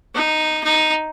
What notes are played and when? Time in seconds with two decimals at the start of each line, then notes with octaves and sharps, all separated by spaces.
0.15 D#4
0.64 D#4